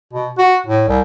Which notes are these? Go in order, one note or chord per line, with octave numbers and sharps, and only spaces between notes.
B2
F#4
A2
C2